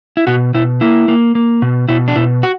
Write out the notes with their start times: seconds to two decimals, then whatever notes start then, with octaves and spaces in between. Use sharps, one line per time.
0.17 E4
0.27 B2 F#4
0.54 B2 E4
0.81 A#3 E4
1.08 A#3
1.35 A#3
1.62 B2
1.89 B2 E4
2.08 D4
2.16 B2 E4
2.43 F#4